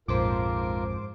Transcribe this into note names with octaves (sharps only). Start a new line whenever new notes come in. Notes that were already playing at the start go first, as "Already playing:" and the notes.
A#1 F2 G#2 F4 A#4 C5 D6